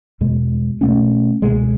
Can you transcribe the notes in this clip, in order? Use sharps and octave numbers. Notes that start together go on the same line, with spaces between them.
E2 B2 G#3
B2 A3 C#4
C#2 B2 G#3